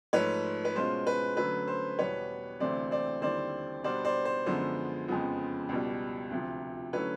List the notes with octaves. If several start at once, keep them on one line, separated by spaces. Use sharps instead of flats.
G#2 F3 A3 B4 C#5
B4
B2 G#3 C#4 F4 C5
B4
D3 F#3 A3 C#4 B4
C5
E2 B2 G3 B3 B4 C#5
D2 C3 E3 A3 C4 C5 D5
C5 D5
D#2 D3 G3 C4 E4 C5 D5
B2 G3 B3 D4 C5 D5
C5 D5
C5
F#2 D3 F3 G#3 B3 C5
F2 C#3 F3 G#3 B3
C#2 B2 G3
D2 C3 F3
D3 F#3 A3 C#4 E4 B4 C#5